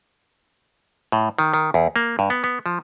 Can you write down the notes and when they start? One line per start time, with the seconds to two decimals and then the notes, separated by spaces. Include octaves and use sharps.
1.12 A2
1.39 D#3
1.54 D#3
1.74 E2
1.96 A#3
2.19 G2
2.30 B3
2.44 B3
2.66 F3